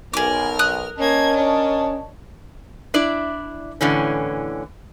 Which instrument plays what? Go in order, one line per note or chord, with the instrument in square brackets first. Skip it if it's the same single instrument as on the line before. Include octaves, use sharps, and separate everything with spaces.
[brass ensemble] B1 [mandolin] G#4 D6 [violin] A#4 F6
[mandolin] D#6 F#6
[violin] A#3 G#6 [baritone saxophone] C#4 [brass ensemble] A#4 D#5 A5
[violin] D4 C#5
[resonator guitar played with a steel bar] D4 E4 D5
A2 D3 E3 C#4